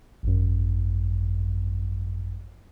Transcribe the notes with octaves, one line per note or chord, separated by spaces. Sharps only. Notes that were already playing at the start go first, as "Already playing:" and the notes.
G#1 F#2